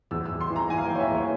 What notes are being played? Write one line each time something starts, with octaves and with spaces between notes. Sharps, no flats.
E2 E6
E6
E2
C6
E3
A#5
E3 G#5
F5
G5
E3
C#5
E5
E2 C#5